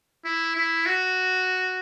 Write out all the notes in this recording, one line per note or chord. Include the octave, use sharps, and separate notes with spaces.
E4
E4
F#4